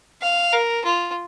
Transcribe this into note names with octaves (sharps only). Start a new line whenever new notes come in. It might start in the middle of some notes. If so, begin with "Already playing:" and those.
F5
A#4
F4